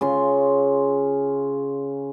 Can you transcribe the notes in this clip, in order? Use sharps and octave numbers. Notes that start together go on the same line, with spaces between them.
C#3 F4 C6